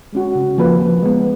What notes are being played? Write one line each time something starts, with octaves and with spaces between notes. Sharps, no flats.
G#3 C#4 F#4
C#3
F3 A#3 F4 B4
F3
G#3 B3